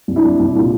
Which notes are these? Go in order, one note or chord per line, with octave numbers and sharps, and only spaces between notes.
C2
D4 E4
C2
C2
A#2